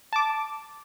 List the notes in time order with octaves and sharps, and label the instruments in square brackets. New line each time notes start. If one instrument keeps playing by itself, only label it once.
[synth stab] A5 D6